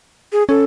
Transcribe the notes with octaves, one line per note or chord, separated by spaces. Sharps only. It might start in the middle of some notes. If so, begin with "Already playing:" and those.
G#4
C#4 A4